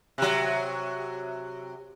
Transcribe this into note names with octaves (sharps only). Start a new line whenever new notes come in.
C3 F#3